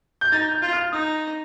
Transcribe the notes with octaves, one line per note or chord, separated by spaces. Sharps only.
G6
D#4 A6
G6
F4
F6
D#4 D#6